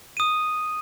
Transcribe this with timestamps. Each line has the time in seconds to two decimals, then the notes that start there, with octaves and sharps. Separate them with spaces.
0.17 D#6 D#7